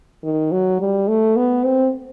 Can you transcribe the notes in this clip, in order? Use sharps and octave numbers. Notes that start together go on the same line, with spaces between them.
D#3
F#3
G3
A3
B3
C4